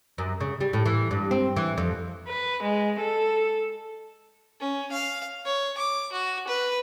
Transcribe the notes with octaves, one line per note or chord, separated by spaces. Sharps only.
F#2
C#3
G3
A2
E3
G2
C4
E3
F2
B4
G#3
A4
C#4
F5
C#5
D6
F#4
B4